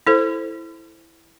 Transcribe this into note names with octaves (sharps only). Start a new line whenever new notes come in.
E4 A4 C5